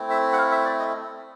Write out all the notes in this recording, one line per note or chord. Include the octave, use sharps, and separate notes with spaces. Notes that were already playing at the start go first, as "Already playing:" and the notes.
Already playing: A3 C4 E4
E5
F#5
F5
E5
D5
D#5